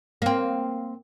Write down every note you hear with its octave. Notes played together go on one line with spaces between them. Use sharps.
A#3 C4